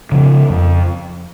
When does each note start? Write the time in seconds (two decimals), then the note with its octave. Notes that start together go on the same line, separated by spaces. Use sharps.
0.12 C#3 F3
0.50 F2